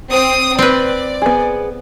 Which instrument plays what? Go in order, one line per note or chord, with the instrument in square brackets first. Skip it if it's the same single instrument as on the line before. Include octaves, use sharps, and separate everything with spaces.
[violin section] C4 D#6
[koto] C4 B4 [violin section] D5
[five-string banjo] B3 G#4